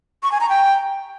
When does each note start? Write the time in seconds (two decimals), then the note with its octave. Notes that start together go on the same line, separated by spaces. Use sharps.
0.23 C#6
0.32 G#5
0.40 A#5
0.49 G5